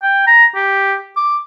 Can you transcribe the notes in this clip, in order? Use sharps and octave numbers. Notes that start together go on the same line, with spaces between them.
G5
A#5
G4
D6